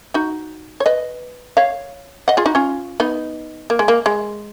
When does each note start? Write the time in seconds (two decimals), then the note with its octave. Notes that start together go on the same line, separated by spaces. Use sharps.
0.14 D#4 F#4
0.80 C#5
0.86 B4 D#5
1.57 C#5 F5
2.28 D#5 F#5
2.37 F4 G#4
2.46 D#4 F#4
2.55 C#4 F4
3.00 B3 D#4
3.70 A#3
3.79 G#3
3.88 A#3
4.06 G#3